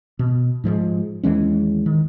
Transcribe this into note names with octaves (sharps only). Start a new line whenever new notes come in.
B2
G#2 F3 G3 G#3
D#2 E3 G#3 C#4
D#3